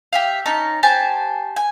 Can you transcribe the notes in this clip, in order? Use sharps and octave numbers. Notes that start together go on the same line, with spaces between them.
G4 E5 F5
C#4 D#4 A5
G4 C5 G#5 A5
G#5